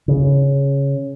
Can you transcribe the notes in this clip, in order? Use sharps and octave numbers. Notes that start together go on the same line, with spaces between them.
C#3